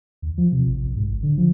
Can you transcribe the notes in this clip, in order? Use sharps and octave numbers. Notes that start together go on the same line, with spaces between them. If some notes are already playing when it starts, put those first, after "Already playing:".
D#2
F3
C3
A1
B1
G#2
G#1
D3
F3